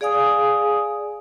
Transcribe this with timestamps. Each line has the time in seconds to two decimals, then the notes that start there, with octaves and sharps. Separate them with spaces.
0.01 G#4 D5 F5 G#5 D#6